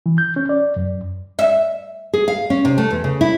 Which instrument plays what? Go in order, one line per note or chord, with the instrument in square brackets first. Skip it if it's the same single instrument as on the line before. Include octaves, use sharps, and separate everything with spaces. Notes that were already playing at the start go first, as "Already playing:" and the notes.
[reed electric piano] E3
G6
C#4
D5
F#2
[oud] E5
[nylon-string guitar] G#4
F5
C#4
C3
A3
E2
C#3
E4